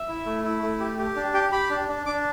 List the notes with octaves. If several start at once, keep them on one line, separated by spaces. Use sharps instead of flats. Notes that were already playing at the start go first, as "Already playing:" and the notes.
Already playing: E5
E4
A3
E4
A3
G4
G4
D4
G4 G5
G4 B5
D4
D4
D4 D6